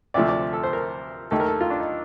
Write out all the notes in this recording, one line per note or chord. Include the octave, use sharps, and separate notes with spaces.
D2 C3 F3 A3 D5
D5
A4
C5
A#4
D#2 D#3 A3 A4
A#4
A4
F4
D4
D#4